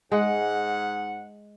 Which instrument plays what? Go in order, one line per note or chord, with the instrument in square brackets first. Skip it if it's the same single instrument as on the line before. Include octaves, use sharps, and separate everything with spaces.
[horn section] G#2 F#5 [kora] G#3